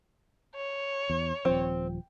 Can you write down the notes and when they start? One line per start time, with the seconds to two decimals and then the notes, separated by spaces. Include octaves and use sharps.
0.55 C#5
1.10 E2
1.45 D#1 F3 C4